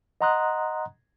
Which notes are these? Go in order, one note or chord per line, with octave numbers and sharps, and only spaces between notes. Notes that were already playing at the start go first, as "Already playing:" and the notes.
D#5 F#5 A#5 C6 D#6 F#6